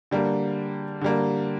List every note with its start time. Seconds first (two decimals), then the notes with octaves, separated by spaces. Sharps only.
0.11 D3 G3 A#3
1.01 D3 G3 A#3